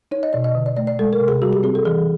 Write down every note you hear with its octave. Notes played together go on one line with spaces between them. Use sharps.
D#4 C#5
D#5
B2 D5
D#5
D3
D5
A3 D5
D5
G#3 A4
A#4
C3
G#4
G3 F#4
G4
C4 G#4
A4
E3 G#4